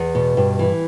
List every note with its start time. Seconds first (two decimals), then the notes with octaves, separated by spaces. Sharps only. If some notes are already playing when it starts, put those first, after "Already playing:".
Already playing: E2
0.15 B2
0.37 G2
0.59 E3